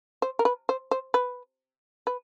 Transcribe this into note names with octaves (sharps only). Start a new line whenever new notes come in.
C5
A#4
B4
C5
C5
B4
B4